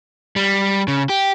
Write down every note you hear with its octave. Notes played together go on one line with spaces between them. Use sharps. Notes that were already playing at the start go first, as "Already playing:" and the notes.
G3
C#3
G4